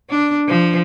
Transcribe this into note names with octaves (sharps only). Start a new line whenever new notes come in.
D4
F3